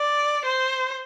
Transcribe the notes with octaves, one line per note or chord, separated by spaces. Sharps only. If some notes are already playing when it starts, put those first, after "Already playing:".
Already playing: D5
C5